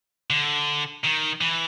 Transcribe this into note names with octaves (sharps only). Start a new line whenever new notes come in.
D3
D#3
E3